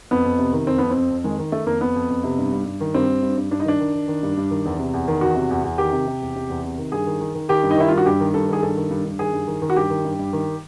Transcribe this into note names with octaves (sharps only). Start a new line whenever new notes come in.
F2 B3
F2
C3
D#3
F2 C4
F2 B3
C4
F2
F2
D#3 G#3
D#3
D#3 A3
F2 A#3
F2 B3
F2
F2
C3
G2
G2
G2
D#3
G2 C4
G2
G2
G2
G2 D4
D#4
D#3 D4
D#3
D#3
D#3
G2
G2
D#3
E2
C3
E2
D#3
E2 F#4
C3
E2
E2
D#3 G4
C3
C3
E2
C3
E2
C3
D#3
G2 G#4
D#3
D#3
D#3
D#3 G4
G2
D#4
D#3 E4
G2 F4
F#4
G2 G4
D#3
G2 A4
D#3 G#4
G2 A4
D#3
G2
G2
D#3 G#4
G2
D#3
D#3
F#4
G2 G4
D#3
G2
G2
D#3